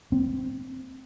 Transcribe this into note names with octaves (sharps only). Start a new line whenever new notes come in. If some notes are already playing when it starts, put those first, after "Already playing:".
C4